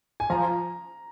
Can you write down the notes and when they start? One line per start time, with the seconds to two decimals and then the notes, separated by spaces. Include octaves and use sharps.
0.20 G#5
0.30 F3 A#5